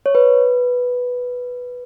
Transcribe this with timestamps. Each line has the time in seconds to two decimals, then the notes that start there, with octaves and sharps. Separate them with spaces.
0.06 C#5
0.15 B4